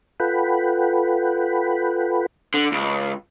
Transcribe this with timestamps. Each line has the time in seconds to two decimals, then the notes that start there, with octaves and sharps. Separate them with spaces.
0.20 F4 A4 B4 F#5 G5 B5
2.54 D3
2.72 C#2